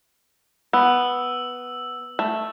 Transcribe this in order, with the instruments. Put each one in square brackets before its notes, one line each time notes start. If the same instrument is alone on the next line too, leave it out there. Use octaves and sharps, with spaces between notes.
[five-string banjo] B3 [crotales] E6
[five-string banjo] A3